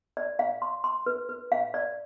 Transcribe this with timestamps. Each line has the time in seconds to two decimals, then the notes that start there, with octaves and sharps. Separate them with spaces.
0.17 D5
0.39 F5
0.62 C6
0.84 C6
1.06 B4
1.29 B4
1.52 F5
1.74 D5